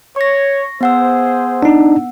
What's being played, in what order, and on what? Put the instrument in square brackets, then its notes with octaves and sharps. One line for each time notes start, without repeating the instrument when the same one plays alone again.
[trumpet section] C#5 [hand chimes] C#6 A#6
[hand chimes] B3 F#5 E6 [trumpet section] G#4 C5
[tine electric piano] D4 D#4